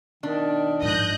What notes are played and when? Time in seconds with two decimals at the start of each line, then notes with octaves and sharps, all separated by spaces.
0.23 B2 D#3 D4
0.82 G#2 F3 D#5 F#6 G6